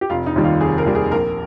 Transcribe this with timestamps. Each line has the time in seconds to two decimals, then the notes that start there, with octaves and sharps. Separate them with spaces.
0.01 G4
0.10 F1 F4
0.26 D#4
0.36 D#2 D#3 G3
0.44 F4
0.60 F1 G#4
0.78 A#4
0.86 D#2 D#3 G3
0.95 G#4
1.11 A#1 A#4